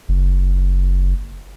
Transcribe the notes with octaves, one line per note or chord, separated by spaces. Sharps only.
F#1